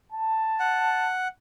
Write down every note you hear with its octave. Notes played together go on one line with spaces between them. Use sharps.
A5
F#5